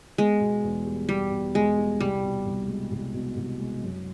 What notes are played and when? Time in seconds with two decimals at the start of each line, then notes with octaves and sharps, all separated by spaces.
0.18 G#3 B3
0.40 B2
0.63 E2
0.86 G3
1.09 G3 B3
1.31 B2
1.55 E2 G#3
1.78 G3
2.00 C2 G3
2.23 B2
2.46 C2
2.68 G#3
2.91 C2
3.14 B2
3.36 C2
3.59 G#3
3.83 F#2